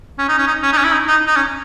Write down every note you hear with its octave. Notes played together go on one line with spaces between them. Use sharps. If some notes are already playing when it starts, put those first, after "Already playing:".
C#4
D#4
C#4
D#4
C#4
D#4
C#4
E4
D#4
D#4
D#4
C#4